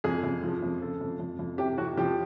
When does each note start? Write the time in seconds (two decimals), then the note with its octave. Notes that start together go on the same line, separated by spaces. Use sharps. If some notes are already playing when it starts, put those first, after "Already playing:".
0.04 F2 G#4
0.23 F2
0.43 F3
0.63 F2
0.82 C#3 A4
1.01 F2
1.19 F2
1.39 F2
1.58 C3 G4
1.78 F2 F#4
1.97 F3 G4